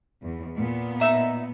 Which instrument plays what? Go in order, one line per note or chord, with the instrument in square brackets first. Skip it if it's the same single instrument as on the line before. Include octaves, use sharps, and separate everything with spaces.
[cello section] E2
A#2 B3
[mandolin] D#4 E5 A#5